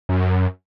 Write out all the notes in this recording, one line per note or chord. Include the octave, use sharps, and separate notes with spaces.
F#2